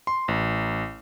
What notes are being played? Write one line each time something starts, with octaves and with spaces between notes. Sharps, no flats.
C6
A1